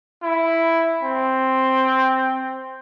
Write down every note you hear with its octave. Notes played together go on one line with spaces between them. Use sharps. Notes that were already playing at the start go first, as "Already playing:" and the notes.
E4
C4